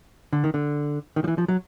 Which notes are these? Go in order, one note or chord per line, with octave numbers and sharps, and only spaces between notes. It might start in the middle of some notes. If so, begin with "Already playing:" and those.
D3
D#3
D3
D#3
F3
E3
F3
F#3